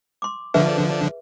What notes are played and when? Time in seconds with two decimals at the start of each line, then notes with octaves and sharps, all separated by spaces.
0.22 C6 D6
0.54 D3 F3 D4 G#4 B4 E5